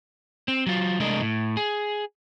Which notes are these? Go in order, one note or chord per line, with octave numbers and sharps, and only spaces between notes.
C4
F#3 F4
C2 G#3 A3 D4 A#4 D#5
A2
G#4